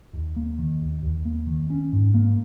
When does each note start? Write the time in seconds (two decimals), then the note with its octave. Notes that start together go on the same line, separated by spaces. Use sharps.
0.13 D#2
0.36 A#3
0.59 D#3
0.81 D#2
1.02 D#2
1.25 A#3
1.47 D#3
1.70 C#4
1.93 G#2
2.14 A#3